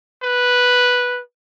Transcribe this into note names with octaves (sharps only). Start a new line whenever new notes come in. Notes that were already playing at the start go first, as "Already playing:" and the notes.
B4